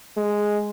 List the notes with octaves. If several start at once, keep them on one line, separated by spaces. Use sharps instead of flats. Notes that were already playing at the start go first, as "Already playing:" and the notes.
G#3